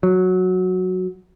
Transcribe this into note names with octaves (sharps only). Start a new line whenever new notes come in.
F#3